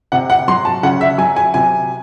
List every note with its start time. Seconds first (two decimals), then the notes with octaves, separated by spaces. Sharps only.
0.12 C3 F#5
0.30 F#5
0.48 F#3 C6
0.65 A5
0.83 C#3 F#5
1.01 E5
1.18 F#3 G#5
1.36 G#5
1.54 C3 G#5